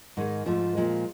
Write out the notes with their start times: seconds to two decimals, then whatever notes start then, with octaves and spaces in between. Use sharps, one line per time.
0.17 G#2 D#3 G#3
0.46 G#2 F3 A3
0.75 A#2 F3 G#3